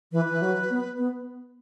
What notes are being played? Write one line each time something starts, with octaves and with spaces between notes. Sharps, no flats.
E3 B4
E3
F#3
B3
B3